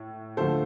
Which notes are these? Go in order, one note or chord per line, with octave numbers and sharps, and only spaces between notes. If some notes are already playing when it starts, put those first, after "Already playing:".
Already playing: A2
D2 D3 F3 A3 A4 C5